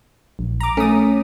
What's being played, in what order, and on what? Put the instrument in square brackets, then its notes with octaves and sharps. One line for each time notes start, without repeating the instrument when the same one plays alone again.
[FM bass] A#1
[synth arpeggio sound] A#5 D6
[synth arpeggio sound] A3 D#6 [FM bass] C#4